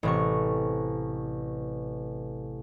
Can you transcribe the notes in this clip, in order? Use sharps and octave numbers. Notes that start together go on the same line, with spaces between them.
A1 C3 C#6